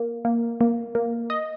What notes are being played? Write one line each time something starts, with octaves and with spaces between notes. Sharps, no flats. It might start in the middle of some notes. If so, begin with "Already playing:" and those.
Already playing: A#3
A#3
A#3
A#3
D#5